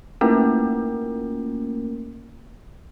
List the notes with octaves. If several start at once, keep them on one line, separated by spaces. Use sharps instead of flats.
A3 A#3 C#4 F4 A#4